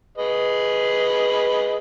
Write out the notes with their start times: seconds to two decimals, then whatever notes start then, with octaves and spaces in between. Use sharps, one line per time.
0.18 G#4 B4 D#5